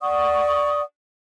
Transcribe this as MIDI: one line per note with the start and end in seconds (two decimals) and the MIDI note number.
0.01 0.82 74
0.01 0.82 78
0.01 0.82 85
0.01 0.82 87